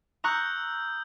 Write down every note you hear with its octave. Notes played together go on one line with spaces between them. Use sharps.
A#5 C#6 D#6 E6 F#6 G6